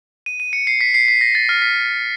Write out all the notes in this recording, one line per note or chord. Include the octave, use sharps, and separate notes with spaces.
D#7
D#7
C#7
C7
B6
C7
B6
A#6
A6
F6
B6